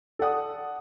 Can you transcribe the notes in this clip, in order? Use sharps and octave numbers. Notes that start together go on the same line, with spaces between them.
A4 D5 F#5 D#6